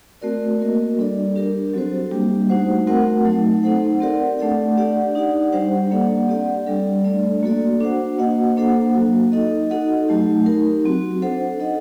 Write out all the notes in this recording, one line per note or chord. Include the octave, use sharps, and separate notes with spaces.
A3 C4 F#4 A#4 D5
A#3 F#4 A#4 D#5
G3 D4 A4 D5
D4 G4 A#4
F#3 C4 F#4 A4 C5
G3 A#3 D4 G4
A3 D#4 F#4 C5 F#5
A3 C4 F#4 A#4 F#5
F#3 A3 D#4
C4 D#4 A4 C5 F#5
C4 G4 A#4 D5 F#5
A3 D4 A4 D5 F#5
D4 G4 D5 F#5
D#4 G4 D5 F#5
G3 D4 G4 C5 F#5
A#3 D4 A4 D5 F#5
C4 G4 D5 F#5
G3 D4 A4 D5
A3 D4 A4 D5
A#3 F#4 A4 D5
D4 F#4 C5 F#5
A#3 F#4 C5 D#5 F#5
A#3 D4 A4 C5 F#5
F#3 A#3 F#4
D#4 A4 D#5
D#4 F#4 A4 D#5 F#5
F#3 A3 D#4 G4
D#4 G4 A#4
F#3 C4 F#4
D4 A4 C5 F#5
D#4 A4 D#5 F#5